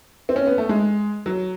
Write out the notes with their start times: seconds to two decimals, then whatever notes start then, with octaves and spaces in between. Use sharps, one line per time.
0.29 C4
0.36 C#4
0.47 B3
0.58 A3
0.69 G#3
1.26 F#3